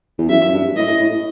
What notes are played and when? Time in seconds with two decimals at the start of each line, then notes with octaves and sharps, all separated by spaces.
0.18 E2
0.29 F#2 E5
0.44 F#2
0.53 G2
0.76 A2 D#5
1.00 A2